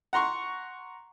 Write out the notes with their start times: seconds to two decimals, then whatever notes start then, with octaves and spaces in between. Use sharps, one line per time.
0.13 F#5 A#5 C6 C#6